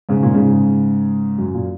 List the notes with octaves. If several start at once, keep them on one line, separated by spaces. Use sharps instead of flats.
G#2 C#3
A#2
G#2 C#3
F#2
A#2